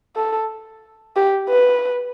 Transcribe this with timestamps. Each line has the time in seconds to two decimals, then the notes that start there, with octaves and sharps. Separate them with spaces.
0.16 A4
1.16 G4
1.49 B4